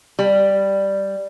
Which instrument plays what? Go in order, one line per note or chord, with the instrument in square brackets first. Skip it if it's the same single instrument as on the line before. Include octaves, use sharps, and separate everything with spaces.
[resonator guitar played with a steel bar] G3